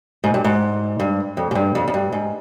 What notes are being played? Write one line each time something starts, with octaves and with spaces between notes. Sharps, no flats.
G#2
G2
G#2
G2
F2
G#2
G2
F2
F2
G2
G#2